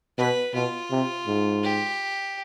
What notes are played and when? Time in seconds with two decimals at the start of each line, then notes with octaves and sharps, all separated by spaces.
0.18 B2 B4
0.54 B2 F4
0.91 C3
1.27 G#2
1.63 G4